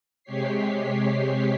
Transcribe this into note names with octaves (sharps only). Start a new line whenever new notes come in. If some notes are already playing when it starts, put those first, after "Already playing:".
C3 G#3 G4 C#5 B6 C7